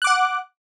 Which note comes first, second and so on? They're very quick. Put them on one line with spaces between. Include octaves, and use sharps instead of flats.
F#6 D6 F#5